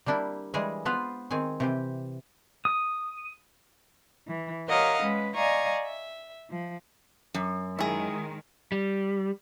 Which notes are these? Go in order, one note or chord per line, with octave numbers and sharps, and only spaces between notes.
G3 A#3 D4 E4 G4
E3 G3 G#3 G#4 G#5
B3 F4 B4 C5 F5
D#3 C4 G#4 G#5
C3 E3 G4
D#6
E3
G4 A#4 C#5 D#5 F5 F#5
G#3 C#4 B4
D5 D#5 F5 G#5 A#5 C#6
E5
F3
F#2
D#3 G#3 E4 G#4
G3